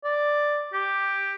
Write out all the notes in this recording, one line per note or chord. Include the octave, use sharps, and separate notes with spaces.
D5
G4